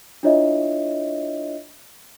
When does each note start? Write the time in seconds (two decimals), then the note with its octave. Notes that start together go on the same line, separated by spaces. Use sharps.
0.23 D4 E4 F4 C#5 D#5 E5